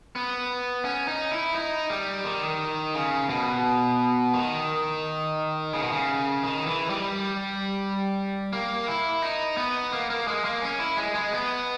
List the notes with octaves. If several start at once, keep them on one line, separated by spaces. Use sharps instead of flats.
B3
C#4
D#4
E4
D#4
G3
D#3
C#3
B2
D#3
C#3
B2
C#3
D#3
E3
G3
A#3
E4
D#4
B3
A#3
A#3
G#3
A#3
C#4
E4
G#3
G#3
B3